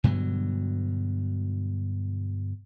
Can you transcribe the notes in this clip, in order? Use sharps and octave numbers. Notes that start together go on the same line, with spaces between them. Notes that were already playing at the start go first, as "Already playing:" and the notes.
G2 B2 D3 F#3